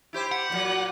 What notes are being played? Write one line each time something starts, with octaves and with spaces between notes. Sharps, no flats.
E4 G4 C5
F#5
D#2 A#2 F#3